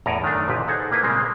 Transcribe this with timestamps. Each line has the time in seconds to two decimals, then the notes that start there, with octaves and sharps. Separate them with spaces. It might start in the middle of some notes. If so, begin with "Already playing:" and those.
0.06 E2 A2 A4 D5 G#5 A#5
0.22 F#2 D#3 A3 D4
0.48 A1 A#2 D3 G4 B4 E5
0.68 D#4 G#4 A4 C5 F#5 G#5
0.91 A#3 E4 B4 C5
1.03 A#2 C#3 G3 G#3 A#3 C4